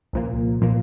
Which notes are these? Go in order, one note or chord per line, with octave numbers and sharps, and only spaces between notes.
C2 A#2 F3 A#3
A#2 F3 A#3